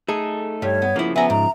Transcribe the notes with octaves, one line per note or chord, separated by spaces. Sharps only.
A3 D#4 G#4 A4
G2 G3 C#5
B3
C#3 F3 A#3 E4
B3 E5 G#5 A#5
G#2 A#5